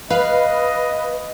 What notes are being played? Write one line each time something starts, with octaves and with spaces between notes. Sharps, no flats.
B4 D#5 F5